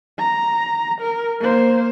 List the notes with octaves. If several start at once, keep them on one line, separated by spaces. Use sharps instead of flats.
A#5
A#4
A#3 C5